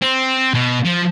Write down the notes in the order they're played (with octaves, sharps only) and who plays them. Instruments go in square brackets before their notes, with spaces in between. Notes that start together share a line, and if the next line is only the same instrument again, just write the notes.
[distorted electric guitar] C4
B2
F3